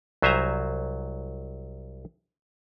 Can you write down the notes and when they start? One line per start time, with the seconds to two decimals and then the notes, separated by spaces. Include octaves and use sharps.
0.22 C2 F#3 C5 E5 G#5 A#5